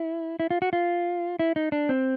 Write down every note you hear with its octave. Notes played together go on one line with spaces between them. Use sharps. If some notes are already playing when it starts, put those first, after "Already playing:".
Already playing: E4
E4
F4
F#4
F4
E4
D#4
D4
C4